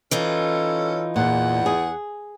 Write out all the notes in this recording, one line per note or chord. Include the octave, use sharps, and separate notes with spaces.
E3 C#4 D#4 F4 A4
E2 A#2 F#5
G#4